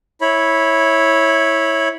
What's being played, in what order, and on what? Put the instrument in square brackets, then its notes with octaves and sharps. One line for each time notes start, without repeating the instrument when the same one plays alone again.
[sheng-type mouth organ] E4 C#5 B5